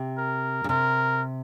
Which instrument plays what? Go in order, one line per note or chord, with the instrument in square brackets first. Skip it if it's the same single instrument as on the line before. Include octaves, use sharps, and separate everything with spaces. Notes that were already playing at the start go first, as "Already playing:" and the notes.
Already playing: [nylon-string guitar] C3
[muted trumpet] A#4
[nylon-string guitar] C#3
[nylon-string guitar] C3 [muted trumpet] A#4